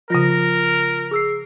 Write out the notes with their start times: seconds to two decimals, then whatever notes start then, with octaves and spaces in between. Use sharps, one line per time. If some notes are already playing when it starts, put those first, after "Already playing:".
0.10 C#3 F3 F4 A#4 A#6
1.11 G#4 E6 C7